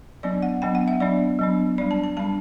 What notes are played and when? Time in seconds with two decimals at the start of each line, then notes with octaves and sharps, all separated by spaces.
0.23 F#3 B3 D4 D5
0.42 F#5
0.62 F#3 B3 D4 G5
0.75 F#5
0.88 E5
1.00 F#3 B3 D4 D5
1.39 F#3 B3 D4
1.78 G3 D4 D5
1.91 A5
2.03 A5
2.17 G3 D4 A5